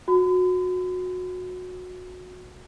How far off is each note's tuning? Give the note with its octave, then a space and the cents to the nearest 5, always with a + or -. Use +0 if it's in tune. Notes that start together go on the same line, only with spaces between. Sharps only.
F#4 -20 B5 +45